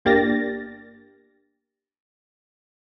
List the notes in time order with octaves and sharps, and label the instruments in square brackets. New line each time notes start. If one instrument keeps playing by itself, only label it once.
[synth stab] G1 A#3 D4 G4 A6 A#6